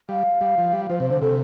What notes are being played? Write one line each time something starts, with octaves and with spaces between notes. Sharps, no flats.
G3 F5
G3
F3
G3
F3 C5
C3 C5
D3 C5
C3 A4